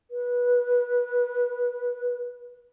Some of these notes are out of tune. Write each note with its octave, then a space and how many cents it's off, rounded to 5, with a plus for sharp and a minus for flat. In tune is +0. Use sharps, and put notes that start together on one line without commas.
B4 -20